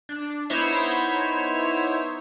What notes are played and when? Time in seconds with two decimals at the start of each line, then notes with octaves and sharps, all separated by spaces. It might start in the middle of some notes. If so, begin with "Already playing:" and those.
0.09 D4
0.50 B3 D#4 E4 C5 C#5 E5